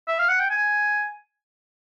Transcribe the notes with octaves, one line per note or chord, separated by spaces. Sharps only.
E5
F5
F#5
G5
G#5